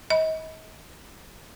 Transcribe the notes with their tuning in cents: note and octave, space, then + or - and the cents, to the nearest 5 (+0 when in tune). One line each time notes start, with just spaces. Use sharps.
D#5 +35 B5 +0